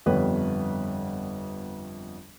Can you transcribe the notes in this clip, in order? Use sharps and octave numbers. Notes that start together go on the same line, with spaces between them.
G1 F2 G3 B3 B4 C#5